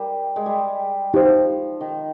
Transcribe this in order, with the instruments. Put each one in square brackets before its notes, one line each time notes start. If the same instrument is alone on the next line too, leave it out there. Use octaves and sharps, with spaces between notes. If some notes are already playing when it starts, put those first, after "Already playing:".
Already playing: [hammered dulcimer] G3 [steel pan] A#4
[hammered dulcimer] G#3
G3
[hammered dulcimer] F3 [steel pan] D#4 G4 C5
[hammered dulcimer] D#3